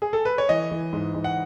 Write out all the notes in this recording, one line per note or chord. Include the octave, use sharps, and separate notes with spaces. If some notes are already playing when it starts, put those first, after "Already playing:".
G#4
A4
B4
C#5
E3 D#5
E3
G#2
G#2
F#5